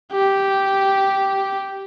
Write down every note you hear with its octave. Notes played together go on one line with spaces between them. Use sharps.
G4